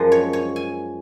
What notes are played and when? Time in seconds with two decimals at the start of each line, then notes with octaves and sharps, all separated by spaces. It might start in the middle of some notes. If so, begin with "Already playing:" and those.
Already playing: F#2 F3 G#3
0.12 C#5
0.33 C#5
0.56 G#5